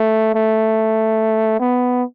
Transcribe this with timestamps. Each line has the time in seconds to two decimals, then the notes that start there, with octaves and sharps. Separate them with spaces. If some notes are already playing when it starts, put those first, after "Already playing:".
Already playing: A3
0.35 A3
1.60 B3